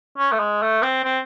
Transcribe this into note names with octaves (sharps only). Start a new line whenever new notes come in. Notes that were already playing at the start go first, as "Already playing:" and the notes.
C#4
A3
G#3
A3
C4
C4